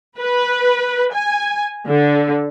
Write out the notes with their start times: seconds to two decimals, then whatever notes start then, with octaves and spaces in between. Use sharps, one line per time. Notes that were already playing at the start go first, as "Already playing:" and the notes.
0.18 B4
1.14 G#5
1.88 D3